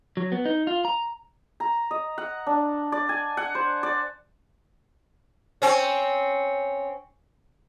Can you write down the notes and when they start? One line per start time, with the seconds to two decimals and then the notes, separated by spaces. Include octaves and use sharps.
0.17 F#3
0.32 B3
0.45 D#4
0.67 F4
0.85 A#5
1.60 A#5
1.91 D#5
2.18 F#5
2.47 D4
2.92 D5
3.09 G#5
3.37 F#5
3.55 C5
3.83 D5
5.62 C4 C#4